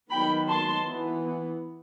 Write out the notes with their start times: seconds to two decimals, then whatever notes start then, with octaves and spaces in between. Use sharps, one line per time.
0.10 D#3 F#3 B3 G5 B5
0.48 A5 C6
0.85 E3 B3